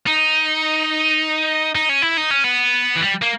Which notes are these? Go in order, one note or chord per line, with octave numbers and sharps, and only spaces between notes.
D#4
D#4
C#4
E4
D#4
C#4
B3
E3
G3
A#3